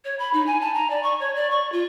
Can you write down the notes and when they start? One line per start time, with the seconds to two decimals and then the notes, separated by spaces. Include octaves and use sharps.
0.04 C#5
0.19 B5
0.33 D#4
0.46 G#5
0.61 A5
0.74 A#5
0.90 D5
1.03 C#6
1.20 C#5
1.35 D5
1.50 C#6
1.72 F4